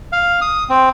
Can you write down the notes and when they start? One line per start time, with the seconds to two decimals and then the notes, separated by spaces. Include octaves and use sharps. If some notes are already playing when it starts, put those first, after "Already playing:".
0.12 F5
0.41 D#6
0.69 C4